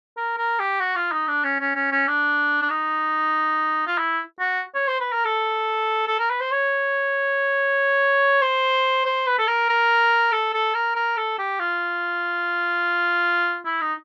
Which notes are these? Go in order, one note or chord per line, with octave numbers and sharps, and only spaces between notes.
A#4
A#4
G4
F#4
F4
D#4
D4
C#4
C#4
C#4
C#4
D4
D4
D#4
F4
E4
F#4
C#5
C5
B4
A#4
A4
A4
A#4
B4
C5
C#5
C5
C5
B4
A4
A#4
A#4
A4
A4
A#4
A#4
A4
G4
F4
E4
D#4